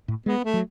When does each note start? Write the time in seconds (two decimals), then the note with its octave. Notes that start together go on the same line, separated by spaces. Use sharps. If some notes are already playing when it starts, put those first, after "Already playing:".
0.08 A2
0.26 G#3 B3
0.45 A3
0.54 F#3